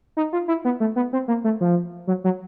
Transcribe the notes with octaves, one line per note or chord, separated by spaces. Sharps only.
D#4
F4
E4
B3
A3
B3
C4
A#3
A3
F3
F#3
F#3